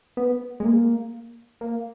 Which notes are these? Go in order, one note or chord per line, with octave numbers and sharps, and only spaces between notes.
B3
G#3
A#3
A#3